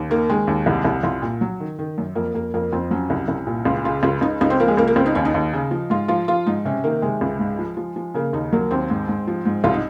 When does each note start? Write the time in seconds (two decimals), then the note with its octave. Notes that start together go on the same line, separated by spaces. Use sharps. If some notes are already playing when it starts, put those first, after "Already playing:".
Already playing: D#2
0.10 D#3 A#3
0.30 D#3 G#3
0.47 D#2
0.66 C2
0.85 C2
1.03 C2 F4
1.22 A#2
1.41 F#3
1.60 D#3
1.79 D#3
1.98 F#2
2.15 F2 A#3
2.34 F2 A#3
2.54 F2 A#3
2.72 F2 C4
2.91 F#3 C#4
3.10 C2
3.28 C2
3.47 A#2
3.65 C#2 F4
3.84 C#3 F4
4.03 C#2 F4
4.21 C#2 D#4
4.41 C#2 D#4
4.50 C4
4.60 F3 A#3
4.68 G#3
4.77 C#2 A#3
4.87 A#3
4.96 C#2 C4
5.06 D#4
5.15 D#2 C#4
5.25 D#4
5.34 D#2
5.53 C#3
5.71 F3
5.90 G#2 F4
6.08 F3 F4
6.28 F3 F4
6.46 G#2 D#4
6.65 C3 C#4
6.84 D#3 A#3
7.02 C3 G#3
7.21 C#2
7.39 G#2
7.59 F3
7.77 F3
7.96 F3
8.14 C#3 A#3
8.33 D#2 D#4
8.52 F#3 A#3
8.71 D#2 C4
8.90 G#2
9.08 G#2
9.27 F3
9.45 G#2
9.64 C2 F4
9.74 D#4